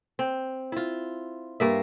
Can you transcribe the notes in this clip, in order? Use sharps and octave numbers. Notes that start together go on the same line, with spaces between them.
C4
E4 F4
G2 A#3 E5